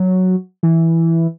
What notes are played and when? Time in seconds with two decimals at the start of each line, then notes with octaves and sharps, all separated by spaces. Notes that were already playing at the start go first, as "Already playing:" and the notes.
Already playing: F#3
0.63 E3